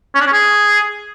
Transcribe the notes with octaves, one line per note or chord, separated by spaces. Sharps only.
C#4
D4
C#4
G#4